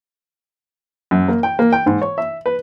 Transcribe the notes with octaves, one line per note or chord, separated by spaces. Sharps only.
F#2
A#3
G5
A#3
G5
G#2
C#5
E5
B4